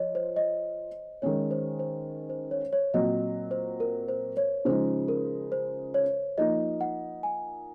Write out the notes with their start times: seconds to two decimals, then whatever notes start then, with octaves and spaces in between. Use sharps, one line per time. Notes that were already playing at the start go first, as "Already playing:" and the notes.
Already playing: F3 F4 C#5 D#5
0.15 C5
0.36 D#5
1.22 D#3 G#3 C#4 C#5
1.51 C5
1.79 C5
2.30 C5
2.51 C#5
2.73 C#5
2.94 A#2 F#3 C4 D#5
3.51 C5
3.80 A#4
4.09 C5
4.37 C#5
4.65 C#3 F3 G#3 D#4 C5
5.08 A#4
5.52 C5
5.94 C#5
6.38 F3 A#3 D#4 D#5
6.81 F#5
7.23 G#5